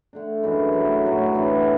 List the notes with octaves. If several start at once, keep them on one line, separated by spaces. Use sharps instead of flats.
D3 A3 D4
F#2 E3 G#3 D4
F#3 A3 E4 B4
A2 F#3 B3 F#4
A2 E3 B3 D4